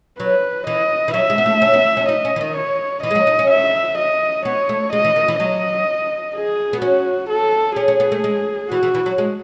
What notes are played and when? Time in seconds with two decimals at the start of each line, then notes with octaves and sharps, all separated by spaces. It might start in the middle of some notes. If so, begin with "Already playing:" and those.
0.20 F#3 B4
0.67 E3 D#5
1.08 E3
1.14 F#3 E5
1.30 G#3
1.38 B3
1.46 A3
1.62 C#4
1.74 B3
1.97 C#4
2.09 D#4 D#5
2.25 C#4
2.36 E3
2.41 D#3
2.56 C#5
3.03 E3 D#5
3.11 G#3
3.15 F#3
3.27 D#4
3.39 C#4
3.50 E5
3.98 D#5
4.45 B3 C#5
4.69 A3
4.92 G#3 D#5
5.05 E3
5.16 D#3
5.28 E3
5.40 F#3 D#5
6.34 G#4
6.73 B3
6.82 C#4 F#4
7.29 A4
7.76 C#4 G#4
7.88 C#4
8.00 B3
8.12 A3
8.24 G#3
8.71 E3 F#4
8.83 E3
8.95 E3
9.06 F#3
9.18 G#3